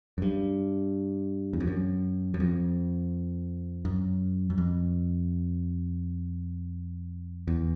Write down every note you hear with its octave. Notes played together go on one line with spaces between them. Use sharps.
F#2
G2
E2
F2
F#2
F#2
F2
F#2
F#2
F2
E2